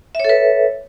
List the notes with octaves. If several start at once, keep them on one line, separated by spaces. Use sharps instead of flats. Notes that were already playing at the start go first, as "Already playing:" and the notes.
A4 B4 C#5 E5